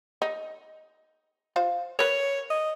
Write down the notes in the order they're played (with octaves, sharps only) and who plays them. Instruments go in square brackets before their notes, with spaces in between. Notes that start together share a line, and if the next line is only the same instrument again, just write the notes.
[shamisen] D#4
F4 C5 F5
[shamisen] A#4 B4 [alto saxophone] C#5
[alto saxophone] D#5